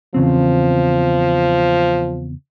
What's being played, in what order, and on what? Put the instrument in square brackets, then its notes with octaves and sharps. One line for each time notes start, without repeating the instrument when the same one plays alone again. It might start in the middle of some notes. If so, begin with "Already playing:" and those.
[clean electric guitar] E2 C#3 C4 [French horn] F3